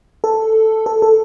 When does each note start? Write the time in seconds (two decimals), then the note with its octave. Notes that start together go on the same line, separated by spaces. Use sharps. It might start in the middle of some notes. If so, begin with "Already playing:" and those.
0.24 A4
0.86 A4
1.02 A4